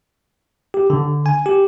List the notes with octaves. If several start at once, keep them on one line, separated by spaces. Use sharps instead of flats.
G4
D3
G#5
G4